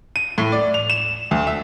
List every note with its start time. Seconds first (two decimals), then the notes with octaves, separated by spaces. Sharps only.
0.16 D#7
0.38 A2
0.52 D5
0.74 F7
0.90 E7
1.31 D2
1.47 E5